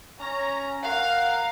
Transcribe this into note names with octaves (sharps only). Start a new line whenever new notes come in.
C#4 A#5
A#4 F5 F#5